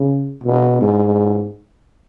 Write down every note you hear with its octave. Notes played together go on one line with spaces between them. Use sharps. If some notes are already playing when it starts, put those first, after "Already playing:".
Already playing: C#3
B2
G#2